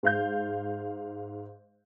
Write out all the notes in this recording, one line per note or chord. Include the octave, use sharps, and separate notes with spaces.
G#2 F5 G6